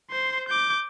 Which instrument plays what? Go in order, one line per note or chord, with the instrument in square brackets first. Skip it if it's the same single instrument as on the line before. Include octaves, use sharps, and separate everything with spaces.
[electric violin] C5 C6
D6 G6